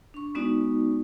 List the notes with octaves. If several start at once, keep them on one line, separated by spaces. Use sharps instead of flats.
D4 C#6
G#3 B3 C#4 D#4 F#4 D5